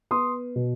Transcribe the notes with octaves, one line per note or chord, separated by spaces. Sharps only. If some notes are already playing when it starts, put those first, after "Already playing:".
B3 C6 D#6
B2